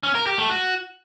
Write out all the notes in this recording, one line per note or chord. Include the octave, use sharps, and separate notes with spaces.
C#4
A#4
G4
A3
F#4